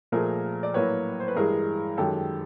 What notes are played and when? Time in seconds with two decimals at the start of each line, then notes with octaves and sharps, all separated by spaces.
0.12 A#2 F3 A3 G#4 A#4
0.63 D5
0.74 A2 F#3 A#3 B4 C#5
1.20 C5
1.28 B4
1.36 G2 E3 G#3 G#4 A#4
1.97 F#2 D#3 G#3 G4 A4